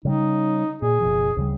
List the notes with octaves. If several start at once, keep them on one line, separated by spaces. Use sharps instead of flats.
C#3 G3 D#4
A#2 G#4
F#1 B2 F3
D2 C#3 G3